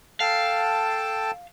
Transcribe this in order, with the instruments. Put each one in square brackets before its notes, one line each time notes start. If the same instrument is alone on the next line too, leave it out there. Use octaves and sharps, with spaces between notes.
[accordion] A4 G5 A5 [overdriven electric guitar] F5